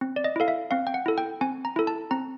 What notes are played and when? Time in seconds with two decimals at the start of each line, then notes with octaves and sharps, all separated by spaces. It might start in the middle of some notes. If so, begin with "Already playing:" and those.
0.01 C4
0.16 D5
0.24 D#5
0.36 E4 A4 F5
0.48 E5
0.71 C4 F5
0.87 G5
0.94 F#5
1.06 E4 A4
1.18 G5
1.41 C4 G#5
1.65 A#5
1.76 E4 A4
1.87 A5
2.11 C4 A#5